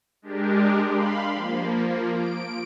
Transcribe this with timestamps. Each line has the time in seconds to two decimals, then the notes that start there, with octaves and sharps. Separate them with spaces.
0.22 G#3 D4 G4 A#4
0.88 F5 B5 C6
1.34 F3 A#3
2.15 D7